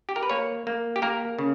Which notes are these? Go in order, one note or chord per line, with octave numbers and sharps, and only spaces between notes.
G4
A#4
B4
A#3 C#5
A#3
G4
A#3 A#4
C#3